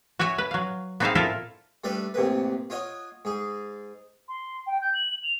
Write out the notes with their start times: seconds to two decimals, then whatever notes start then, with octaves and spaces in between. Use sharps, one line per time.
0.19 F#4 C#5 E5 G#5
0.38 B4
0.51 F#3 F5
1.00 B3 C4 D#4 G#4 E5 F5
1.15 A#2 E4 F4 A4 A#4 E5
1.84 G3 A3 D4 A4 B4 D5
2.14 A1 C3 A#3 B4
2.70 F4 C#5 D#5 F#5
3.25 G#2 G#4
4.28 C6
4.66 G5
4.81 G6
4.94 F#7
5.23 F7